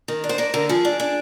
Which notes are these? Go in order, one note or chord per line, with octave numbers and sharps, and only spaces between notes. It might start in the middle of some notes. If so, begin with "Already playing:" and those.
D#3
D4
C5
A#3 D5
D3 A#4
F3 G#4
D4
D4